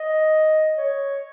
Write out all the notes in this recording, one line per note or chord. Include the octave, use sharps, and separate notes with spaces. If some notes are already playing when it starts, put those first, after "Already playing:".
Already playing: D#5
C#5